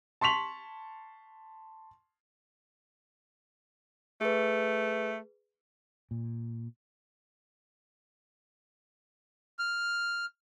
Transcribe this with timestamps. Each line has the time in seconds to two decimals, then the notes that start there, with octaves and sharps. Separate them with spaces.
0.21 A5 C6 C#6 B6 F7 F#7
4.21 A3 G#4 B4
6.11 A#2
9.59 F6